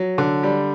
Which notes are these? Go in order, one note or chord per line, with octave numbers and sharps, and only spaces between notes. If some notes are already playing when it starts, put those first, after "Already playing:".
Already playing: F#3
D3
G3